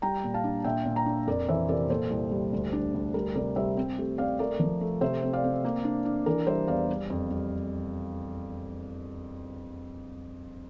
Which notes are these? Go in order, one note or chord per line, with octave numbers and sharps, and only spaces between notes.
G3 G5 A#5
A#2
F5 A5
D4
A#2 E5 G5
A#2
G5 A#5
D4
F2 A#4 D5
E3 C5 E5
C3 A#4 D5
A#2 A4 C5
C2
G3
D2
D4
D2
G3 G4 A#4
C3 A#4 D5
G3 C5 E5
C4
A3 G4
C4 D5 F5
A3 A#4 D5
F3
A3
C3 C5 E5
C4
D5 F5
C4
A#3
D4
D4
E3 A#4 D5
G3 C5 E5
E2 D5 F5
G3
F2
G3